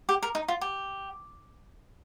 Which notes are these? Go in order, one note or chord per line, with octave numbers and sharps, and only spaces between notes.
G4
A#4
D#4
F4
G4